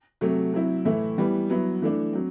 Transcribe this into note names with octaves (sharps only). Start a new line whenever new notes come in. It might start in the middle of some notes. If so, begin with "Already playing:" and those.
C3 F#3 A3
F#3 C4 E4
A2 E3 A3 E4
E3 G3 B3
F#3 B3 E4
E3 A3 D4
F#3 C4